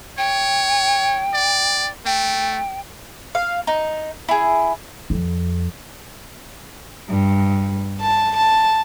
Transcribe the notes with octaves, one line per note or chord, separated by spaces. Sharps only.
C#5 G5
D5
A3 G5
F5
D#4
E4 G#4
F2
G2
A5
A5